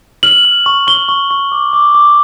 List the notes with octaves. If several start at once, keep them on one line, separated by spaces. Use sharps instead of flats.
F6 F#7
F6
C#6
C#6 G7
C#6
C#6
D6
D6
D6